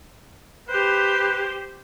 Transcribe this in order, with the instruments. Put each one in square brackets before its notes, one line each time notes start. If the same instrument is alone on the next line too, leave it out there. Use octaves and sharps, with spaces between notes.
[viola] G4 C5 [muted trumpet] B4